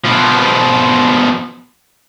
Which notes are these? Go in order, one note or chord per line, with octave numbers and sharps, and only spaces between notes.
B2 F3